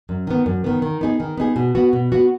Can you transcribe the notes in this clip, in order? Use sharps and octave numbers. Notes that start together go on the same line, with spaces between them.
F#2
D#3 B3
F#2
D#3 B3
D#3
B3 D#4 G#4
D#3
B3 D#4 G#4
B2
B3 F#4
B2
B3 F#4